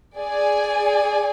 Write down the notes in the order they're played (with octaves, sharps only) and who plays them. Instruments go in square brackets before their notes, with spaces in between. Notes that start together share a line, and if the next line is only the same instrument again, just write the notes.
[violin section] G#4 D5 G#5